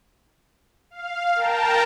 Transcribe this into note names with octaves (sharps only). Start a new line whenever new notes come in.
F5
A#4 G5 A5 A#5